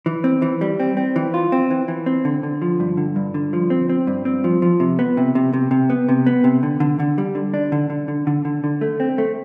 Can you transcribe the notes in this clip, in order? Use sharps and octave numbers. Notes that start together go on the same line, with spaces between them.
E3
C4
E3
G3
C4
C4
E3
F4
C4
E3
E3
C4
D3
D3
F3
G2
D3
G2
D3
F3
C4
C4
G2
C4
F3
F3
C3
B3
C3
C3
C3
C3
B3
C3
B3
C3
D3
D3
D3
G3
D3
D4
D3
D3
D3
D3
D3
D3
A3
C4
A3